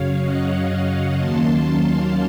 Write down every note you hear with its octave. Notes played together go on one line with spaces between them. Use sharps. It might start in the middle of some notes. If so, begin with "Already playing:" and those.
Already playing: F#2 C#3 F#3 C#5 F5
D#5 F#5
D#2 D#3 F#3 A#3 C#4 A5 C6
A5 C6
F5 A5